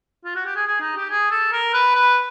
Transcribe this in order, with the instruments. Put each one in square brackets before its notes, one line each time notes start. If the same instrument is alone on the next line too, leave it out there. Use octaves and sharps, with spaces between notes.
[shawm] F4
F#4
G4
G#4
G#4
D#4
G4
G#4
A4
A#4
B4
B4